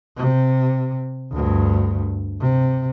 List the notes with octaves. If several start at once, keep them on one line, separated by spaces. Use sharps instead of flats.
C3
D2 G2
C3